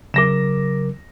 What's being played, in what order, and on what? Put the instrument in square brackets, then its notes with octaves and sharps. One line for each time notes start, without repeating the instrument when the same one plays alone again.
[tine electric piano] C#3 F#3 A#4 [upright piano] D6 A#6 E7